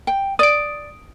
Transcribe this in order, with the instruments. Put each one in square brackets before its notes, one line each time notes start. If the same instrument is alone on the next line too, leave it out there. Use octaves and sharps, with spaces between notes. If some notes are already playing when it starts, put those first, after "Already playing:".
[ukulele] G5
[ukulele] D5 [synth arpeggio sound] D#6 D7